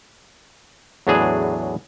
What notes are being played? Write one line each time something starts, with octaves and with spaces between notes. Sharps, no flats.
E2 A2 F#3 D4 G#4